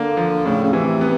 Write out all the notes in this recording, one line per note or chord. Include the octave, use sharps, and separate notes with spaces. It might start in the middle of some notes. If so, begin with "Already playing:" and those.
Already playing: D3 A#3
F3
A2 C#3
C#3
C3 E3
B3